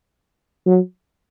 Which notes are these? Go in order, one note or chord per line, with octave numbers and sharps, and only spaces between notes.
F#3